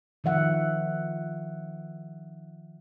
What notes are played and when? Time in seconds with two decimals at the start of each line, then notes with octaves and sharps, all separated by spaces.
0.24 D#3 F3 E5 F#5